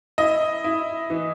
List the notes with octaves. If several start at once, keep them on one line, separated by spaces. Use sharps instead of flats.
E4 D#5
E4
E3